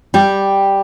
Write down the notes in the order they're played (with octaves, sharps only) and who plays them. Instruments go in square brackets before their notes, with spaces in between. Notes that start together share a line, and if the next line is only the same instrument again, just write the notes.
[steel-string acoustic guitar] G3 G4